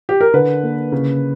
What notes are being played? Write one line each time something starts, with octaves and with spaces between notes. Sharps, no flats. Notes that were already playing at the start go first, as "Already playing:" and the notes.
G4
A#4
D3 B4
A#3
C#3